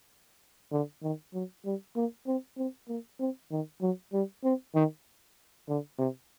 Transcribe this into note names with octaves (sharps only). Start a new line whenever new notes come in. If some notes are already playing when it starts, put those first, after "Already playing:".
D3
D#3
F#3
G3
A#3
C4
C4
A#3
C4
D#3
F#3
G3
C4
D#3
D3
C3